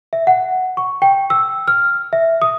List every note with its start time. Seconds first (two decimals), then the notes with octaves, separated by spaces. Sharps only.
0.13 E5
0.27 F#5
0.77 C#6
1.02 G5
1.30 E6
1.68 F6
2.13 E5
2.42 D#6